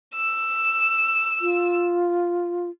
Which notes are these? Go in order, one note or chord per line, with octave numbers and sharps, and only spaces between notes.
E6
F4